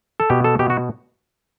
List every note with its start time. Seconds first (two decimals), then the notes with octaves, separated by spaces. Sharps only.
0.20 A4
0.30 B2 G4
0.44 A4
0.59 B2 G4
0.70 F#4